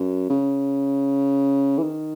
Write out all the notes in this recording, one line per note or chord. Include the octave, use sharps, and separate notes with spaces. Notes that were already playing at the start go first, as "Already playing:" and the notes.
Already playing: F#2
C#3
E3
D#3